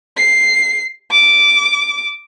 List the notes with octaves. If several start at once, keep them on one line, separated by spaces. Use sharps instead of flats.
C7
D6